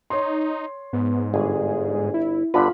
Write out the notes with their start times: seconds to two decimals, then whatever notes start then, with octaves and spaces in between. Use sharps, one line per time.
0.10 D#4 C#5 C6
0.93 G#2 B3
1.34 G1 G#4
2.14 E4
2.54 G1 D3 F4 B4 B5